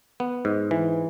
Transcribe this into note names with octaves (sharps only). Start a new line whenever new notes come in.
B3
G#2
E3